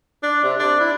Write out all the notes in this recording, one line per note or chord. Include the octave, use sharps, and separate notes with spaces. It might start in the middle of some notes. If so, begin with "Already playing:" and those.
D4
C3
D4
E4